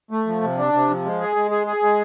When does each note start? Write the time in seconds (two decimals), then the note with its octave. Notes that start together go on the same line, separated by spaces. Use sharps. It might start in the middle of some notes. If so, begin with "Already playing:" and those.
0.11 A3
0.27 F3
0.42 C3
0.58 D4
0.73 C3
0.89 F3
1.05 G#3
1.21 G#4
1.36 G#3
1.51 G#4
1.67 G#4
1.83 G#3